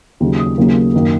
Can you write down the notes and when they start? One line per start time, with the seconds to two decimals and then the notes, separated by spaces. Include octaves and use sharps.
0.20 D#2 C#3 F#3
0.39 D#6
0.58 D#2 C#3 F#3 A#3
0.94 F#2 D#3 A#3